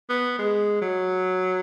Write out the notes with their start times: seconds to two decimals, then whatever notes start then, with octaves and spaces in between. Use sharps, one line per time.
0.10 B3
0.39 G#3
0.82 F#3